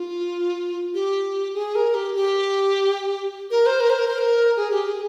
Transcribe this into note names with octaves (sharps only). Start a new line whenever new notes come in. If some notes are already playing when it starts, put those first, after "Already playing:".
Already playing: F4
G4
G#4
A#4
G4
G4
A#4
C5
A#4
C5
A#4
C5
A#4
G#4
G4
G#4